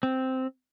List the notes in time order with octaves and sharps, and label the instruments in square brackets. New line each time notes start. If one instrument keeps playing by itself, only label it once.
[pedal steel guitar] C4